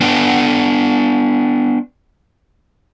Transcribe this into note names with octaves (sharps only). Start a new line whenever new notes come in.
B3 D4 B4 G5